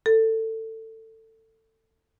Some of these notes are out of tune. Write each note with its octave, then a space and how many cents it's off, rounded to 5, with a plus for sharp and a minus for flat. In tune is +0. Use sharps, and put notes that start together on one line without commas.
A4 +20